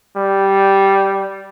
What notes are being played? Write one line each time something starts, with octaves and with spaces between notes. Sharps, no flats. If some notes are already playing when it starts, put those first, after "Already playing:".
G3